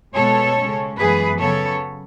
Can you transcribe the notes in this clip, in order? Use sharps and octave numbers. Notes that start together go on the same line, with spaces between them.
B2 G#3 B3 A4 C#5
C#3 G#3 C#4
F#2 E3 G#3 B3 G#4 B4
C#3 F#3 B3 A4 C#5